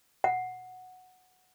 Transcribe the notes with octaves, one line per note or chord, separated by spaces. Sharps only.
F#5